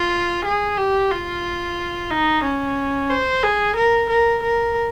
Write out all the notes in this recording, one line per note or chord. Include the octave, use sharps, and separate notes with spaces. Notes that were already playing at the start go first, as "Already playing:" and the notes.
Already playing: F4
G#4
G4
F4
D#4
C#4
C5
G#4
A#4
A#4
A#4